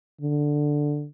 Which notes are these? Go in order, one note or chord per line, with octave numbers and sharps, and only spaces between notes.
D3